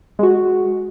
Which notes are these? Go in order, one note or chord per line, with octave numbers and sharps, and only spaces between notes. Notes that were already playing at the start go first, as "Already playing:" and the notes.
G#3 F#4